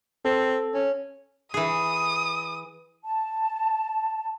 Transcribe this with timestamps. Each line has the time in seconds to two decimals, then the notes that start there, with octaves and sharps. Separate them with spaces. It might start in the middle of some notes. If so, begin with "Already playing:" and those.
0.25 C4 A4
0.74 C#4
1.54 E3 G#4 D#6
3.04 A5